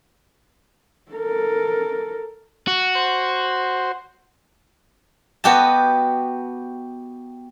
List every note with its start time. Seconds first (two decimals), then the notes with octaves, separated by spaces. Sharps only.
1.12 A4 A#4
2.67 F#4
2.95 C5
5.44 B3 F#4 G4 D#5 A5